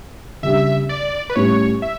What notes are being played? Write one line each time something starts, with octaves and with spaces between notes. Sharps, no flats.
C#3 G3 D4 G4 E5
D5
B4
A2 G3 C#4 G4 C#5
E5